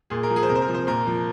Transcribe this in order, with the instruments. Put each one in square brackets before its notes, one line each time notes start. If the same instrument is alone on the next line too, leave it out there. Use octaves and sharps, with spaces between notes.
[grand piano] A#2 G#4
A#4
F3
G#4
C5
C3 A#4
C5
A#4
F3
C5
A#2 A#4
F3